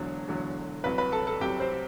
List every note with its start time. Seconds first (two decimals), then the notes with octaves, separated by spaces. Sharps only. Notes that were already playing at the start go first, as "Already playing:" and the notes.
Already playing: E1 E2 D3 F#3
0.28 E1 E2 D3 F#3
0.84 C2 C3 F#3 B4 B5
0.98 B4 B5
1.12 A4 A5
1.27 A4 A5
1.41 C2 C3 F#3 G4 G5
1.60 C4 C5